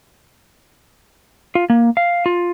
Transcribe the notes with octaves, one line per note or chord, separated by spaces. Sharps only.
F4
A#3
F5
F4